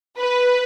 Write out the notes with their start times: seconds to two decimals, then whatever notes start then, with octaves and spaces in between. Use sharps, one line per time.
0.19 B4